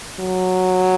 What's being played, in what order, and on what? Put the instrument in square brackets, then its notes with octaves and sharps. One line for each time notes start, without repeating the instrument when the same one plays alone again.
[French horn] F#3